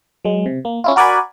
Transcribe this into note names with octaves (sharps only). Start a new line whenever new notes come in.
F#3 G#3
C3
A#3
C#4 E4 F4
F#4 A#4 D5 F#5 G#5 B5